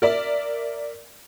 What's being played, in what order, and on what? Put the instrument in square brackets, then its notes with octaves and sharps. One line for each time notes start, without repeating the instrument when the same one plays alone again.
[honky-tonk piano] A#4 D5 E5